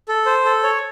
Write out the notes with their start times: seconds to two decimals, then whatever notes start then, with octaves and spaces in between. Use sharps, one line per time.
0.08 A4
0.26 C5
0.45 A4
0.63 C#5